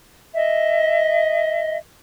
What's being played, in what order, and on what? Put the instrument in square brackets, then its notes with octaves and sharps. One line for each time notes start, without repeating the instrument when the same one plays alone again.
[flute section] D#5 E5